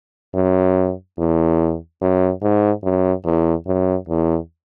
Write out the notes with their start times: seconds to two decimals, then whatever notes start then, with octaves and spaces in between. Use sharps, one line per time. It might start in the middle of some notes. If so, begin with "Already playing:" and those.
0.34 F#2
1.18 E2
2.01 F#2
2.42 G#2
2.84 F#2
3.25 E2
3.67 F#2
4.09 E2